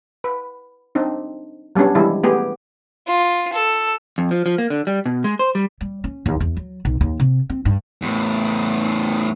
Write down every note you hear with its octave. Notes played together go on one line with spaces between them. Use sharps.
B4
C4 D4 D#4
F#3 G3 B3 C#4 D4
E3 F3 G3 G#3 E4
A3 B3 G4 G#4
F4
A4
F2
F3
F3
A#3
D3
G3
B2
G#3
C5
G3
G3
C#4
D#2
E2
F#3
B1
D#2
C3
C4
G2
E2 A2